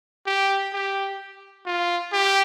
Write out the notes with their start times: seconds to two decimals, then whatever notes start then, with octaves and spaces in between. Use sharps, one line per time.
0.26 G4
0.73 G4
1.66 F4
2.12 G4